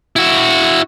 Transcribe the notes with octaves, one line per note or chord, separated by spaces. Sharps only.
E4 F#4